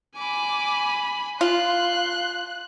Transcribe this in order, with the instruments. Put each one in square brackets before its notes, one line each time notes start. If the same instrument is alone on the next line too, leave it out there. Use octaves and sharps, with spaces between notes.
[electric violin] G#5 B5 [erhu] D6
[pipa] F4 [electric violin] C6 [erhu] F#6